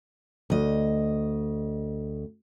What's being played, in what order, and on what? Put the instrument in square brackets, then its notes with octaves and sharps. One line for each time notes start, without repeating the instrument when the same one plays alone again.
[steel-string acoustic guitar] D2 D#5